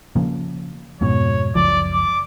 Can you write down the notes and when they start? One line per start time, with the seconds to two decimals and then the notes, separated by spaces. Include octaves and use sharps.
0.16 C#3 F3 A#3
1.01 F2 G#2 B2 C#5
1.55 F#1 C#2 F3 D5
1.92 D6